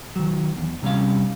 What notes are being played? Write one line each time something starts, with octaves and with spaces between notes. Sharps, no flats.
D#3 F#3
E2
C3 G3 C#4 F5